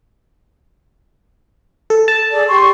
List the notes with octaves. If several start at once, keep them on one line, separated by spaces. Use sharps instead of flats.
A4
A5
G#4 A4 D5
G4 C6 C#6